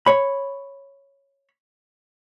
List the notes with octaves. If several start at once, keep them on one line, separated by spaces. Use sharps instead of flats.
C#5 B5